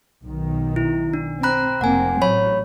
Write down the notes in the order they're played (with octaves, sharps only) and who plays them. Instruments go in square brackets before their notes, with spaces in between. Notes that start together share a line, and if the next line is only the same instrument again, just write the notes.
[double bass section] B1 D#3
[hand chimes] E4
D4
[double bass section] C4 [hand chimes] A#5 B5 F#6
[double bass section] F1 A#3 C4 [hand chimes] F#5 G#5
[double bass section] A1 F#3 [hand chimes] C#5 B5